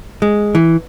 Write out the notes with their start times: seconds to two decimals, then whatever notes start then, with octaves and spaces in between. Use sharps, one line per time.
0.22 G#3
0.55 E3